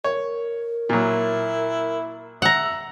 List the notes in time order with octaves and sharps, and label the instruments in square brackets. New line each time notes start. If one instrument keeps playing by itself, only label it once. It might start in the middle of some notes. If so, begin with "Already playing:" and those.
[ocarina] A#4 [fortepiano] C#5
[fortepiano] A#2 F#3 [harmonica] E4
[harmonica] E5 [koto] F#5 A#5